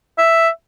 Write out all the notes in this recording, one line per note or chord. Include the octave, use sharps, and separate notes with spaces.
E5